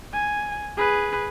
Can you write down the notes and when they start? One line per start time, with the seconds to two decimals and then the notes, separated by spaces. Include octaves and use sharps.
0.13 G#5
0.77 G#4 B4